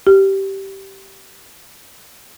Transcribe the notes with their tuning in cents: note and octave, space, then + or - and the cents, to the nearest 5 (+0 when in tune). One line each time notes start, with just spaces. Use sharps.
G4 -15